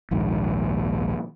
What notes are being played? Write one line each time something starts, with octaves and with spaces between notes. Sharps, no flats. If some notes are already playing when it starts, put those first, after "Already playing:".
A#1 D#2 G#2